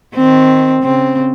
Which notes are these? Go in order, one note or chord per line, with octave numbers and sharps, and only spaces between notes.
D#3 C4
C#3 C4